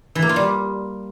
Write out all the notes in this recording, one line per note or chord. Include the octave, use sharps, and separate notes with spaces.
E3
A#3
F4
G3